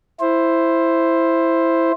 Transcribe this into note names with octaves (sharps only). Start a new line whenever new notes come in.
E4 C5